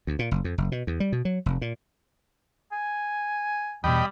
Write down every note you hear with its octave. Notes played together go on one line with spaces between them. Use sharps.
D2
A#2
F#1
F2
F#1
B2
E2
G3
B2
F#3
F1
A#2
G#5
E2 B2 G3 D#5 G5 B5